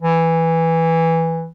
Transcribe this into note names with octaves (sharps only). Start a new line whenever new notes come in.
E3